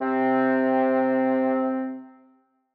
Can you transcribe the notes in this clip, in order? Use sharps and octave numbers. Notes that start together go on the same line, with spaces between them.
C3 C4